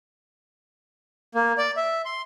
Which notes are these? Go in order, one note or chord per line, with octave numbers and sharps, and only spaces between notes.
A#3
D5
E5
C6